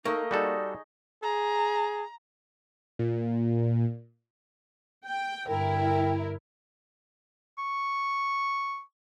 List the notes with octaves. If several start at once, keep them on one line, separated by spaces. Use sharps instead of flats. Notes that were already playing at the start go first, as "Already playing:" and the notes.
A3 A#3 D#4 D#5
G3 D#4 F#4 G#4 A4 D5
G#4 A#5
A#2
G5
G2 D3 E4 A#4 G5
C#6